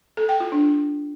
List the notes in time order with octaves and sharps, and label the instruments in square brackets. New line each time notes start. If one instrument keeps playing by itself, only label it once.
[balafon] A4
G5
F4
D4